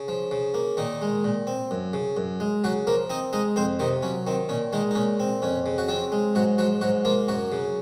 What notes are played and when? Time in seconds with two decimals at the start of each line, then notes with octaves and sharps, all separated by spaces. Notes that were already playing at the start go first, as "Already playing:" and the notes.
Already playing: C#3
0.08 F3
0.31 C#3
0.54 A#3
0.77 A#2 D#3 D#4
1.02 G#3
1.24 A#2
1.47 C4
1.71 F#2
1.93 C#3
2.17 F#2
2.40 G#3
2.64 C#3 F#3 F#4
2.87 F3 A#3 A#4
3.10 C4 D#4 D#5
3.33 G#3 D#4 D#5
3.56 F2 C4 C5
3.79 C3 D#3 D#4
4.03 F#3 C#4
4.27 D#3 C4
4.49 A#2 C#4
4.73 D#3 G#3 D#4
4.91 D#4
4.95 A#2 C#4
5.20 C4
5.42 F2 C#4
5.66 C#3
5.78 F#4
5.88 F3 C4 F4
6.12 G#3
6.35 G#2 F#3 F#4
6.58 F3 F#3 F#4
6.81 G#2 F#3 F#4
7.05 F3 A#3 F4
7.28 F#2 F#3 F#4
7.52 C#3